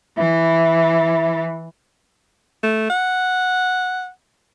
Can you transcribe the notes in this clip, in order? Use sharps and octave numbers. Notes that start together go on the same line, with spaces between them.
E3 E4
A3
F#5